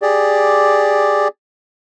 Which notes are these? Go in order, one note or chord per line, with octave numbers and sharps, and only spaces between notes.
G4 G#4 D5